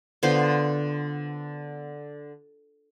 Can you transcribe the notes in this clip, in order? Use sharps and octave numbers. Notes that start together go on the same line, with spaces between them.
D3 B3 F4 C5